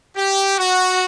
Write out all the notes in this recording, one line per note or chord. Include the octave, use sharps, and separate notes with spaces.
G4
F#4